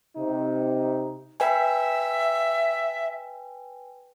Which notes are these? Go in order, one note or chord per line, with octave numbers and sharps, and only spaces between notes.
C3 D#4
B4 E5 G5 G#5